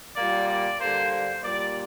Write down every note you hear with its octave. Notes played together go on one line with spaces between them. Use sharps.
A#2 G3 A#3 D5
D5
D3 G3 A#3 C5
C5
A#2 G3 A#3 D5